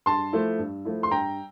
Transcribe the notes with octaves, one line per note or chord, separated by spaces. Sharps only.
G2 A5 C6
F3 A3 E4
G2
F3 A3 E4
C6
G2 G5 A#5